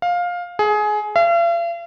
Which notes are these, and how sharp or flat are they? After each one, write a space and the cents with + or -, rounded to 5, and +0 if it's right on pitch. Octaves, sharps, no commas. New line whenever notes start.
F5 +15
G#4 +20
F5 -45